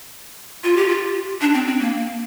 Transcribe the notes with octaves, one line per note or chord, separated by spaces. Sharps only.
F4
G4
F4
D4
C4
C4
A#3